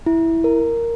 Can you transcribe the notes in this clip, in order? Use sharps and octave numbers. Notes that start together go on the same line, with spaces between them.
E4
A#4